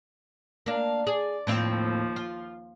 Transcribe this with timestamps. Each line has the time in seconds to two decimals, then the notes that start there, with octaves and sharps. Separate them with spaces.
0.66 A#3 D4 F5
1.07 G#4 D5
1.47 D#2 A2 F3 C4 F5
2.16 F4